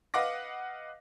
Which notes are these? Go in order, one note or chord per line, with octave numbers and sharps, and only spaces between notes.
B4 D#5 F5 F#5 D6 A#6